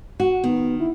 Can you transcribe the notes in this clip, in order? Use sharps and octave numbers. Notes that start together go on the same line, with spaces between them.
F#4
D#3 B3
E4